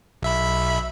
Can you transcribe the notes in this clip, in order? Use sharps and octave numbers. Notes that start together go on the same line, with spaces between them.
B1 E5 B5